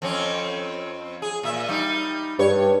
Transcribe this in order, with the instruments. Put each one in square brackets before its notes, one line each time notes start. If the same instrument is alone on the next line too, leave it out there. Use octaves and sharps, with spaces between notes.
[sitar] F2 C4 C#4
G#4
A#2 E5
G3 D#4
[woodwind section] G2 [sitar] C#5